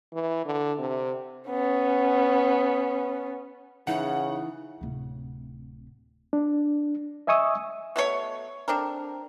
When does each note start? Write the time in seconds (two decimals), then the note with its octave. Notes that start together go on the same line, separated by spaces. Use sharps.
0.13 E3
0.46 D3
0.79 C3
1.50 B3 C#4
3.87 C#3 E3 D#4 E4 F#5
4.81 D1 C3
6.33 D4
7.27 D#5 E5 G#5 C#6 D#6 E6
7.96 B2 A3 C4 C#5
8.68 C4 D4 A4 A#4